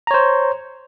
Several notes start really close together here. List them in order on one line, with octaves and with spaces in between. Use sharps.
A#5 C#5 C5